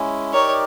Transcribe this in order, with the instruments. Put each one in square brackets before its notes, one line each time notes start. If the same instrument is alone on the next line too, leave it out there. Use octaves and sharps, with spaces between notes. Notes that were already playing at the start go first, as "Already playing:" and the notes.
Already playing: [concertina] G#3 C#4 E4
[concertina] D#4 G4 A#4 D5 [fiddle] C#5